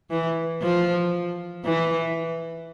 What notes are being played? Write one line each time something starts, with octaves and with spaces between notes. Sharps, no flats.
E3
F3
E3